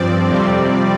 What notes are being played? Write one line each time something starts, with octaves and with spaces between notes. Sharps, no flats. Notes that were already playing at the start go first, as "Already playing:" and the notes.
Already playing: G2 F3 C4 D5
F2 C3 G3 C4